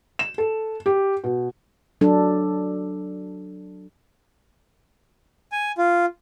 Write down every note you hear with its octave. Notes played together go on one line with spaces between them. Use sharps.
E7
A4
G4
B2
F#3 D4 A4
G#5
F4